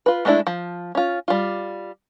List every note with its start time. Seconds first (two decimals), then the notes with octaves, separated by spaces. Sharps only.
0.06 F4 B4
0.25 G#3 A3 B3 D4 E4
0.47 F3
0.95 C#4 F4
1.28 G3 F4